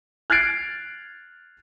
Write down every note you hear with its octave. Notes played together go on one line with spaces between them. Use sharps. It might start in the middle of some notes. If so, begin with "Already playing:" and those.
F6 F#6 G#6 A6 C7 D7